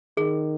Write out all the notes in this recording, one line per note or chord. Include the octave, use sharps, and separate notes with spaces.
D#3 G#4